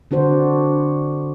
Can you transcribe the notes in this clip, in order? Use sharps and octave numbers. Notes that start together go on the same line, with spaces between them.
D3 D4 F#4 C5